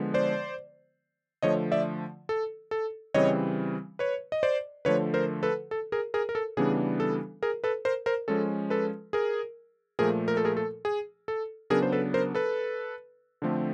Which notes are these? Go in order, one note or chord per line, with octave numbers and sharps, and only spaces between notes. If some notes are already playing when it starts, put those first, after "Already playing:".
Already playing: D3 F3 G#3 B3
C5 D5
D3 F3 A3 C#5 D#5
D5 E5
A4
A4
C#3 E3 G3 C4 C#5 D#5
B4 C#5
D#5
C5 D5
D3 F3 A3 B4 C#5
A#4 C5
A4 B4
A4
G#4 A#4
G#4 A#4
A#4
A4
C#3 E3 G3 B3 D4 G#4
A4
G#4 A#4
A4 B4
A#4 C5
A#4 C5
F3 G#3 C#4 A4
A4 B4
G#4 A#4
A#2 F3 A3 G#4 A#4
A#4
A4
G#4 A#4
A4
G#4
A4
C#3 F#3 B3 D4 G#4 A#4
C5
A4 B4
A#4 C5
A4 B4
D3 F3 A3 C4